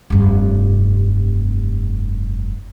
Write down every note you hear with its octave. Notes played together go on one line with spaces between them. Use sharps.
F1 G2